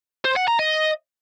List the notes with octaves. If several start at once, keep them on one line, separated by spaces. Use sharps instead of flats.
C5
F#5
A#5
D#5